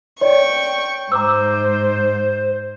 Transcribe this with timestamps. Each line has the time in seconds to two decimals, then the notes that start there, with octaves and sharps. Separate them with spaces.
0.21 C#5 D5 G5 C#6
1.12 G#2 C5 A#5 D6 E6